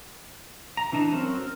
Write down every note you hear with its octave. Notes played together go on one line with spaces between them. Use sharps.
A#5
E3 D4 D#4 A5 A#5
F#3 C4 C#4 A#4
A#4